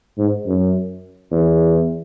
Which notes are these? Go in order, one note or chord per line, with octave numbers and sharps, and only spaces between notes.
G#2
F#2
E2